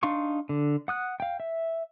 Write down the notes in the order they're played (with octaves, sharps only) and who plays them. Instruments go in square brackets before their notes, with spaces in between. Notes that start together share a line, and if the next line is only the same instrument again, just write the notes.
[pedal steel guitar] D4 D#4 F5 C6 C#6
D3
F#5 D#6 F#6
F5 G5
E5